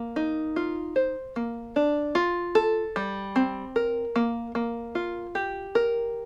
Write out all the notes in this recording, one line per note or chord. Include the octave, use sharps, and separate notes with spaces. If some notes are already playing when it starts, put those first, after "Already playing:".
Already playing: A#3
D#4
F4
C5
A#3
D4
F4
A4
G3
C4
A#4
A#3
A#3
F4
G4
A#4